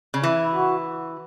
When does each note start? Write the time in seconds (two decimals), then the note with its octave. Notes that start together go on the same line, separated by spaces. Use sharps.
0.14 C#3
0.23 E3 E4
0.55 F#4